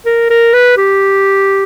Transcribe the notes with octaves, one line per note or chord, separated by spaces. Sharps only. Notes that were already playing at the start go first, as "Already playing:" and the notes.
A#4
A#4
B4
G4